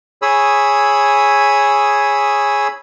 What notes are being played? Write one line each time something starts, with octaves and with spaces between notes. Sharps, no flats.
G#4 C#5 B5 D#6 E6